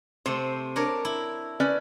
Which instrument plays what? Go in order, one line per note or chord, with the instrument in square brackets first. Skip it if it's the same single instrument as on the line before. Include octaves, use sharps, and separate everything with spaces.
[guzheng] C3 A3 [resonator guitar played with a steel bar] C5
[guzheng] D4 A#4 C#5
E4
[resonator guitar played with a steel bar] C#4 B4 D5